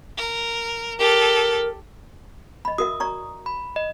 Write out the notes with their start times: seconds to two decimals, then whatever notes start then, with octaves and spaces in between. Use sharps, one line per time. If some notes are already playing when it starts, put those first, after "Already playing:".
0.17 A#4
0.99 G4 A4 A#4
2.65 D#5 B5
2.78 F#4 A#4 E5 D#6
3.00 D5 A#5 C#6
3.46 B5
3.76 D#5